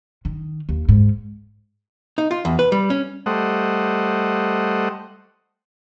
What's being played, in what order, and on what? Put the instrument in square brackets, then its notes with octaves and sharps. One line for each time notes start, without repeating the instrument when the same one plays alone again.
[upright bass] D#3
D#2
G#2
[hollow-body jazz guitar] D#4
F4
E2
B4
G3
C#4
[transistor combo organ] G3 A3 C5 D#5 F#5